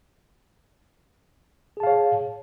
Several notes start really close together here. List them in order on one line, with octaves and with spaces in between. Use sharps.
G#4 A5 F5 C#5